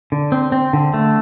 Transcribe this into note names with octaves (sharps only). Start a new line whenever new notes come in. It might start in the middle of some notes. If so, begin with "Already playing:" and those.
D3
C4
C4
D3
A3